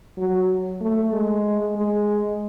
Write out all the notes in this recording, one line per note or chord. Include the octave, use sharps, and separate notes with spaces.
F#3
A3
G#3
G#3